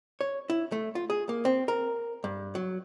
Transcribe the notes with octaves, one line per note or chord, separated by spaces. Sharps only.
C#5
E4
A3
F4
G#4
A#3
C4
A#4
G2
F#3